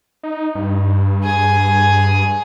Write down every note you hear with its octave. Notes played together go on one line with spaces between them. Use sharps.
D#4
G2
G#4 G#5